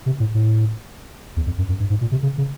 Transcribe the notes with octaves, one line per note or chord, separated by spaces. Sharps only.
C3
A2
A2
E2
F2
F#2
F#2
G2
G#2
A#2
C3
C#3
C#3